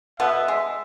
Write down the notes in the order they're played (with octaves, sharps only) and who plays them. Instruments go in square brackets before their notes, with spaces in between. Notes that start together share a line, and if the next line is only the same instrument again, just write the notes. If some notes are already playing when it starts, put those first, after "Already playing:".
[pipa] B2 B3 [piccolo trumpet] E5
[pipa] G#3